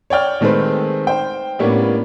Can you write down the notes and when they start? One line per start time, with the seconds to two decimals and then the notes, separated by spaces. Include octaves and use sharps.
0.10 C#5 D5 G5 F6
0.41 D#3 G#3 A3 C4 B4 C5
1.07 C5 G5
1.59 A2 G3 A#3 B3 C#4 D4